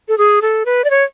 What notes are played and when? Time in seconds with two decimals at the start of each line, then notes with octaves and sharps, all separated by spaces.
0.08 A4
0.18 G#4
0.42 A4
0.66 B4
0.84 D5
0.90 C#5